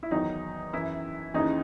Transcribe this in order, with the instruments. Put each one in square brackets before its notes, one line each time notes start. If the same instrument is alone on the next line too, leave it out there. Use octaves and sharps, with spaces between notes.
[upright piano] E4
E2 D#3 F#3 D#4
F#2 E3 E4
D#2 C#3 E3 D#4